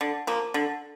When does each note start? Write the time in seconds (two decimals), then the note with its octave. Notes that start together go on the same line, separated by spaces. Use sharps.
0.01 D3
0.27 F3 A#3
0.54 D3